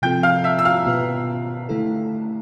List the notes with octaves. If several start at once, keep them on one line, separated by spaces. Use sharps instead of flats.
C3 F3 C4 F4 A4 G5 G6
F5 F6
E5 E6
E6
F5 F6
B2 B3 F4 B4
D3 A3 E4 A4